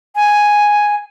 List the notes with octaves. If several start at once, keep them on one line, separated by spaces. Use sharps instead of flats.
G#5